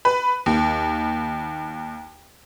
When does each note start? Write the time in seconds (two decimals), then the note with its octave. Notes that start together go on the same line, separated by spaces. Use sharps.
0.05 B4
0.46 D#2